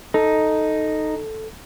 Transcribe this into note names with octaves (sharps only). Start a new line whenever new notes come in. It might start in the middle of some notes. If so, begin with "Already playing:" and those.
D#4 A4